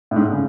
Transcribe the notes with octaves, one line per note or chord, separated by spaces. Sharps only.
A2
G#2
C#3